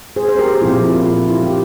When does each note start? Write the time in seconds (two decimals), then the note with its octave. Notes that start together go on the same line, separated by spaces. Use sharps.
0.16 G#4 C5
0.29 C5
0.39 G4 A#4
0.61 A#2 F3 C4 E4 F4
0.83 E4
1.05 F4
1.29 E4 G4
1.43 G4